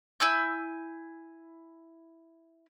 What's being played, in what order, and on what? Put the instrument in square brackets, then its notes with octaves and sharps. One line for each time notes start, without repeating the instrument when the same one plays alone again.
[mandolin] E4 G#5 E6 G6